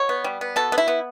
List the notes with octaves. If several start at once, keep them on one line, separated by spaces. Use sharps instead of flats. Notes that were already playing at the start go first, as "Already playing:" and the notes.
Already playing: B2 C#5
B3
G3
B3
B2 A4
B3
E4
B3